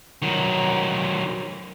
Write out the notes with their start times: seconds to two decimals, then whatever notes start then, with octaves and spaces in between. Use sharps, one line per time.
0.22 D#3 F#3